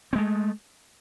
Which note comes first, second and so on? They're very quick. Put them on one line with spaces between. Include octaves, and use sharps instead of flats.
C4 G#3 A3